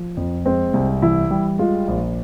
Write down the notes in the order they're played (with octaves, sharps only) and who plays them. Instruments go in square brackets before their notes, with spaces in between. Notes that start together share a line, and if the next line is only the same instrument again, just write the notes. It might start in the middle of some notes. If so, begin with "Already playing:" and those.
Already playing: [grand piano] F3
F2
[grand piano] G#3 [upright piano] C4
[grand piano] C2
[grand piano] E3 [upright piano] E4
[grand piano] G3
[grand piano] G#3 [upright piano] F4
[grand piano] A#1